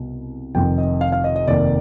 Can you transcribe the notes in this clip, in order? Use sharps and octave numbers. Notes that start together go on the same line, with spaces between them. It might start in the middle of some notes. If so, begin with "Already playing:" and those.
Already playing: C2 B2
F1 F2 D#3 G5
D#5
F5
F5
D#5
D#5
F1 D#2 D#3 D5